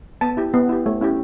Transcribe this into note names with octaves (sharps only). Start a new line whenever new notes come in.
B3 A5
E4 G4
B3
E4 G4
A3
C#4 E4 G4